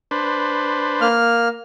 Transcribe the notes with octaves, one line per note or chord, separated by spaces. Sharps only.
D4 B4 C5
A#3 F6